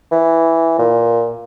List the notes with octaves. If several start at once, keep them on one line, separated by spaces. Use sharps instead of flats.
E3
A#2